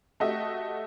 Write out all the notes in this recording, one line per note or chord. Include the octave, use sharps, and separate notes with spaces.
A3 F#4 G4 D#5 E5